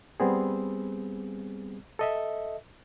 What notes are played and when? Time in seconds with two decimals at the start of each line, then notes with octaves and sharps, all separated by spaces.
0.20 G3 B3 C4 G#4
1.99 A4 D#5 E5